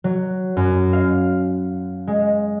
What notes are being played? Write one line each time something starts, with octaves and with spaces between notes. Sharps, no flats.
F#3
F#2
F5
G#3